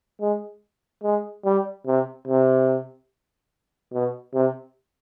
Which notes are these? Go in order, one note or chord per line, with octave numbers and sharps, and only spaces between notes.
G#3
G#3
G3
C3
C3
B2
C3